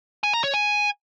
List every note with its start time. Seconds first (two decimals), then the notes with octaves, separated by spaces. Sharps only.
0.24 G#5
0.34 A#5
0.44 C#5
0.54 G#5